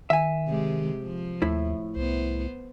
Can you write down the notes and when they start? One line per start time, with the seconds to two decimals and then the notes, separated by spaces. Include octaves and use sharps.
0.10 D#3 E5 G#5
0.47 C3 G#3 G4
1.02 F3
1.42 D#2 A2 E4
1.96 C2 B3 C5